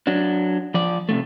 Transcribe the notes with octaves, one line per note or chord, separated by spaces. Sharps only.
F#3 D4
F3 D5
C3 D#3 A3